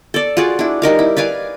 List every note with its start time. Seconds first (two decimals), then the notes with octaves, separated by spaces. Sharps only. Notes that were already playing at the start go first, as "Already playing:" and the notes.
0.14 A4 D5
0.37 F4 F#4 G#4 D5
0.59 D4 E4
0.82 G3 D#4 A#4 F5
0.99 E4
1.17 B4 D5 F5 G#5